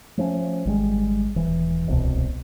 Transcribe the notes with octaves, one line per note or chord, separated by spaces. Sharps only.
F3 A3 B3 C#4
G#1 G3 G#3
D#1 E3
D1 C2 B2